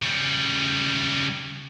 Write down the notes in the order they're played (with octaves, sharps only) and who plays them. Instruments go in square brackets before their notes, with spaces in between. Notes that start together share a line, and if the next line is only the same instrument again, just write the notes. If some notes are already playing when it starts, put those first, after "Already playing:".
[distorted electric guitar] C#3 G3